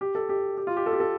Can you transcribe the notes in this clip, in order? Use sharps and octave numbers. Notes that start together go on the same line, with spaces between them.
G4
A4
G4
G4
F4
G4
A4
G4
A4